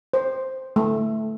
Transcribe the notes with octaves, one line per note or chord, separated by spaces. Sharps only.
C5
A3